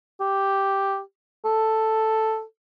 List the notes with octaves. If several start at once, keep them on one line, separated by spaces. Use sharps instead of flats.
G4
A4